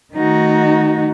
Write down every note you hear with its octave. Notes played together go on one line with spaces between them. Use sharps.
D#3 A3 D#4 F#4